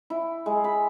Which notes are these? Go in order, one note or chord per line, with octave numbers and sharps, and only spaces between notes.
E4
G#3
B5